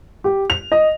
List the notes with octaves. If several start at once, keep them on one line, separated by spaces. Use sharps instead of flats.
G4
F7
D#5